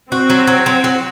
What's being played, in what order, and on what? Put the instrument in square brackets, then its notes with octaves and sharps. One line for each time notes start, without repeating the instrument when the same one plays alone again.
[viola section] C4 [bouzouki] F#4
[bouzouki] F#3
F#3
F#3
F#3